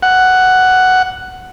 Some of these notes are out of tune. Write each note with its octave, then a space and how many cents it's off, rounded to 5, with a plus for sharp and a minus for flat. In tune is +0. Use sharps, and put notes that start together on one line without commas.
F#5 +5